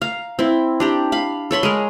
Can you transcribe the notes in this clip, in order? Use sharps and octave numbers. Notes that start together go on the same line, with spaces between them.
F5 A#5
C4 E4
D4 G4 A#5
F5 B5
A4 C#5 B5 C6
G#3 G#4 A#4